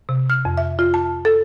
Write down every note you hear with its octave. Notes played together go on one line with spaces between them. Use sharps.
C3
F6
F2
E5
F4
A5
A4